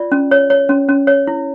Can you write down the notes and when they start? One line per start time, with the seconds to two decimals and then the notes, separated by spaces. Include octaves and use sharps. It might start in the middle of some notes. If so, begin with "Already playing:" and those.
Already playing: F4 D5
0.12 C#4
0.31 C#5
0.50 C#5
0.69 C#4
0.89 C#4
1.07 C#5
1.27 E4